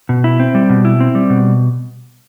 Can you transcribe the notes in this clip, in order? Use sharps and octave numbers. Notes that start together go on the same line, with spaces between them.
B2
E4
C4
G3
B2
E4
C4
G3
B2